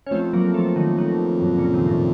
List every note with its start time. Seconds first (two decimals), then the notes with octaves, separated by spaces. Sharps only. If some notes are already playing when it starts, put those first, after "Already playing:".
0.07 C#4
0.11 F2 A3 C4
0.33 F#3 A#3
0.54 F3 A3
0.76 D#3 F#3
0.98 D#3 F#3
1.41 F#2 A#2
1.58 A#2 C#3
1.74 C3 D#3
1.86 A#2
1.90 A2